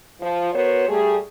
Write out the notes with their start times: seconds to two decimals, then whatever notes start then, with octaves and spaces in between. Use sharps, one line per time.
0.21 F3
0.53 B3 F#4 A#4 C5 C#5
0.89 G3 A3 G#4